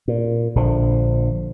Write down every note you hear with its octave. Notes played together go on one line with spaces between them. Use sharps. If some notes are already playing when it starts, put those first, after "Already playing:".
A#2
A#1 D3 F3